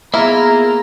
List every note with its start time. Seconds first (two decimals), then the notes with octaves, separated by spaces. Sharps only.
0.14 A#3 B3 E4 F4 G#4 A#5